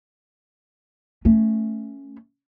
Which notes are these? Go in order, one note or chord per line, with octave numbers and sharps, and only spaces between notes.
A3 C#4